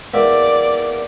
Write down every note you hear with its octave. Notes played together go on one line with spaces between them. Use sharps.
E2 A#3 D5 E5